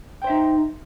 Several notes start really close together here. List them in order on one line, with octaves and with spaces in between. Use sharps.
G5 C5 E5 D#4